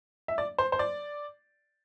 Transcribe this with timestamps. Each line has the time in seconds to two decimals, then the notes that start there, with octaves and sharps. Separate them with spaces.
0.28 E5
0.38 D5
0.58 C5
0.72 C5
0.79 D5